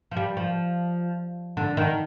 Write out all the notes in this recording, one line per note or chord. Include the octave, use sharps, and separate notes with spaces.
F3
G3
F3
D3
D#3